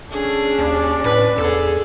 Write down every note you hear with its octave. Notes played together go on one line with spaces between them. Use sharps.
C#4 D4 G#4 A4
D#2 D5
A2 B4
E2 G#4 A4